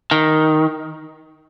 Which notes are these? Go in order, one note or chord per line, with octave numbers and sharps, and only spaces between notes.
D#3